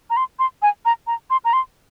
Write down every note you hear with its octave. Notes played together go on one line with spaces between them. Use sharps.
A#5
C6
C6
G#5
A#5
A#5
C6
A#5
C6